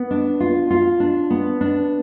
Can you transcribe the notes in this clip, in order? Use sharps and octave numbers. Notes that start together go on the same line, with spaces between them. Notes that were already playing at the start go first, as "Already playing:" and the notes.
Already playing: B3
D4
F4
F4
D4
B3
D4